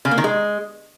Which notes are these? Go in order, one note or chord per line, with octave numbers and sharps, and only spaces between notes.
C#3
A#3
D#3
G#3